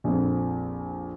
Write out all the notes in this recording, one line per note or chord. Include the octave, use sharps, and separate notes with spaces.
A#1 F2